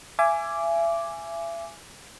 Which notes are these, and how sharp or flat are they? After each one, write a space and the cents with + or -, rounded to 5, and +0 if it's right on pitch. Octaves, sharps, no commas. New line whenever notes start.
E5 +35 G#5 +0 D6 -5